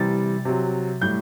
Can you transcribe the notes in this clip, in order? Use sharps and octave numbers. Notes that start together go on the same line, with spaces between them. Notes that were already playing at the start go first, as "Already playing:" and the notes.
Already playing: C3 E3 G3 A6
C3 F#3
A2 G3 G6